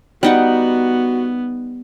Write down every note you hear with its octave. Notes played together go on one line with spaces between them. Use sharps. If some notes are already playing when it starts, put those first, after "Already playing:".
G3 B3 D#4 F#4 F#5